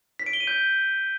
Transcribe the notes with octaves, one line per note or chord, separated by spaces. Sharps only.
B6
D7
G7
D#7
G6